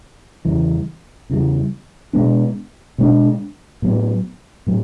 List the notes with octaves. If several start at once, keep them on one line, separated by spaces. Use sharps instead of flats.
E2 C#3 E3 G3
E2 C#3 E3 G3
B2 G#3 B3 D4
B2 G#3 B3 D4
A2 F#3 B3
A2 F#3